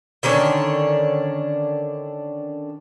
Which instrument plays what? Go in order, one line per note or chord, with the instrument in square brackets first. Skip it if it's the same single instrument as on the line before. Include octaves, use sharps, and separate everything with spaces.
[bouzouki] D3 D#3 C#4 D4